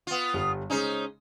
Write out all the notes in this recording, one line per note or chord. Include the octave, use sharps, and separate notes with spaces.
B3 F4
G1 G3
C#3 G#3 C#4 D#4 C5